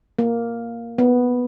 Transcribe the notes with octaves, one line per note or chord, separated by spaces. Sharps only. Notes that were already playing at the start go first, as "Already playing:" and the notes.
A#3
B3